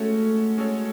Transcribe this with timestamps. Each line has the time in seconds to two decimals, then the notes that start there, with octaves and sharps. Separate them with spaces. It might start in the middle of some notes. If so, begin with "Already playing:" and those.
Already playing: G#3 A3 C#4 F#4 A4 C#5
0.57 G#3 C#4 F#4 A4 C#5